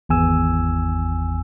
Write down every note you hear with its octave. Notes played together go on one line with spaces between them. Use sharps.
G#1 E2 G#5 E6